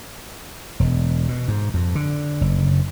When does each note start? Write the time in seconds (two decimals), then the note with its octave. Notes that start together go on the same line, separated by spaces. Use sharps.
0.80 E1
1.28 B2
1.48 G#2
1.74 F2
1.95 D3
2.41 F#1